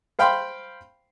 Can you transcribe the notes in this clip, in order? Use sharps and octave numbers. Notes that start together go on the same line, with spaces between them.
C5 F5 G5 B5 C6